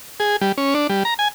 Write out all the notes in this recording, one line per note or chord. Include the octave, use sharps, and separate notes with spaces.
G#4
G3
C#4
D4
G3
A#5
G#5